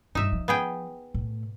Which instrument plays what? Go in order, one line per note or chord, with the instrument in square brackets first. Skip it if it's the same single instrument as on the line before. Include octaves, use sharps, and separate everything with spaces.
[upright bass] G2 [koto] D#4 E5
[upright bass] F3
[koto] B3 G#4 G5
[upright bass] A2